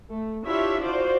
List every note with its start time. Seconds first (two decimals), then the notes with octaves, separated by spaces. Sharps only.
0.10 A3
0.44 D4 E4 F4 G4 C#5 E5
0.82 F4 F#4 C5 D5